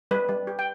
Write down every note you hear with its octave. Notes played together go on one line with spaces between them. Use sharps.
G3 B4
G3
G4
G5